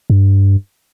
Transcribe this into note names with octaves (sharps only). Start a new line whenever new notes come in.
G2